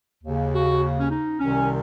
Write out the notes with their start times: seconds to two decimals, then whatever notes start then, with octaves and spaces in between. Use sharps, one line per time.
0.23 D#2 C#3
0.52 F#4
0.98 C#4
1.10 D#4
1.39 C2 C3 D#3 C#4